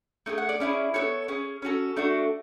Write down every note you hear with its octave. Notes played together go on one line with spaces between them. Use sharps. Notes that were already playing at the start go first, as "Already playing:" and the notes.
A3 D4 G#4
F#5
D5
C#4 E4 G#4
B3 F#4 A4 C#5
C#4 G#4
C#4 F#4 A4
A3 D4 F#4